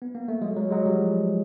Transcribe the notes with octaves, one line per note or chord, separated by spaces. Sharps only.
B3
A#3
A3
F#3 G#3
F#3 G#3
F#3 G#3
F3 G3